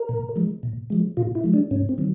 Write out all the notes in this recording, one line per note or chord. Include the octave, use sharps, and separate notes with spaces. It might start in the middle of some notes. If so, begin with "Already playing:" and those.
Already playing: A#4
A#2
F3 G#3
A#2
F3 G#3
A#2 F4
E4
F3 G#3
D4
G#2 C#4
C4
D#3 F#3